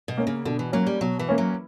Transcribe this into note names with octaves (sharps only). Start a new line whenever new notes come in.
B2
A#3 C#4
C#3
B2 D3
E3
F#3 A#3 C#4
G3
B2 F#3
E3
A#3 C#4
F#3